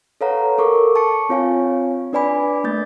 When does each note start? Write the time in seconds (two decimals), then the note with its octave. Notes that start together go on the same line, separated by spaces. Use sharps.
0.21 A4 B4 C#5 F5 F#5 A#5
0.58 A4 A#4 C#6 D6
0.96 A5 C#6 C#7
1.29 C4 F4 C#5 F5 G#5
2.13 D4 B4 D5 G#5 B5 D6
2.64 A3 A#3 G6 A6